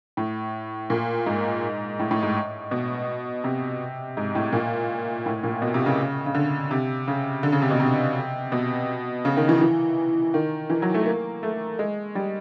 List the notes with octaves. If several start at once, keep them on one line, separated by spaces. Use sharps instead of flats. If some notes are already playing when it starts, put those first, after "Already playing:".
A2
A#2
G#2
A2
A2
G#2
B2
C3
G#2
A2
A#2
A2
A#2
B2
C3
C#3
C#3
D3
C3
C#3
D3
C#3
C3
B2
C3
B2
C#3
D#3
E3
E3
D#3
E3
F#3
A3
A#3
A3
G#3
G3